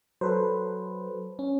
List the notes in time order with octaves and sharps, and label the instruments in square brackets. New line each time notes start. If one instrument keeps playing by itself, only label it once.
[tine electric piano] F#3 [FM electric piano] A4 B4 C5
[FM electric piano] C#4